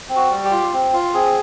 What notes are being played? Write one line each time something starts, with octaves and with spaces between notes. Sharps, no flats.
C4
F#4
G3
G4
F4
C4
F4
C4 G#4